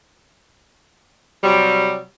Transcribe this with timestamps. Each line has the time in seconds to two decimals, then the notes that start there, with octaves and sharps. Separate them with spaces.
1.43 C3 F#3 G3